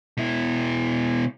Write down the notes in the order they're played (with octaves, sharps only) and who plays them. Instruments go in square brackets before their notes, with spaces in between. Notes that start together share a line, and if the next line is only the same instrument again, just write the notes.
[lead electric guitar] B2 E4